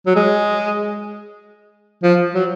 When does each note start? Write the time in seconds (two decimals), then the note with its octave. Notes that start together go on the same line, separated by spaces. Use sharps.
0.07 F#3
0.16 G#3
2.03 F3
2.35 F#3